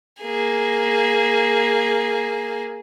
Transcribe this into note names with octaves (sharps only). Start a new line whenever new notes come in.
A#3 G#4